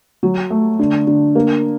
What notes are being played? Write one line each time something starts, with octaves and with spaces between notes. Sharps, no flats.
F#3
A3
D3
D3
A#3